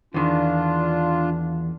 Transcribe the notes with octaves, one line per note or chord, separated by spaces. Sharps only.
E2 D#3 D4 F4